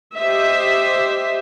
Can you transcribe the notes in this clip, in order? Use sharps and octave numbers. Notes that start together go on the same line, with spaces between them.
G4 C5 D#5 E5